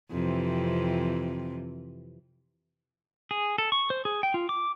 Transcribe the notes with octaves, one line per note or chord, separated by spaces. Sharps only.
F2 C3 E3
G#4
A4
C#6
C5
G#4
G5
F4
D6